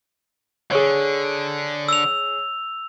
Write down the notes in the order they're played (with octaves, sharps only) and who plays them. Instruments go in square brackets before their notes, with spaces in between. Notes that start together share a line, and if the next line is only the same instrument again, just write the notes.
[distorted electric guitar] D3 [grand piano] G#4 C#5
[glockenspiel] E6 F7